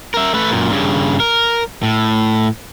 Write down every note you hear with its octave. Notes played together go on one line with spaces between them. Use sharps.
A#4 E5
A3 B4
F#2 A#2
G2 C#3
A#4
A2